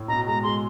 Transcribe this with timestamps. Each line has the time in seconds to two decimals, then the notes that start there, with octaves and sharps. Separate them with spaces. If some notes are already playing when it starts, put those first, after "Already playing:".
Already playing: A2
0.08 B2 A#5
0.26 G#3 A#5
0.43 G#3 C6